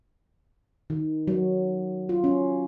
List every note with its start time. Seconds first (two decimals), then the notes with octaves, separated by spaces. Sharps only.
0.90 D#3
1.27 F#3
2.09 F4
2.24 C#4